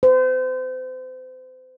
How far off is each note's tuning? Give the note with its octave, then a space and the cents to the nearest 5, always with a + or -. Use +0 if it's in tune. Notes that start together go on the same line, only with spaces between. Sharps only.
C5 -35